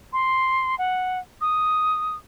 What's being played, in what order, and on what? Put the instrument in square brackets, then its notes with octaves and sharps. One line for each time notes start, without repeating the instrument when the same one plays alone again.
[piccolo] C6
F#5
D#6